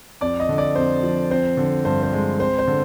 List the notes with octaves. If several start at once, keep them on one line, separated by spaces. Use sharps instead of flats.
F2 D5
D#5
D3
D5
F2 C5
F3
C4 C5
D3
G2 C5
C5
G#3
C4 C5
C5
D3